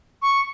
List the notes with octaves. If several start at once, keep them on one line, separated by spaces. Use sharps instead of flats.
C#6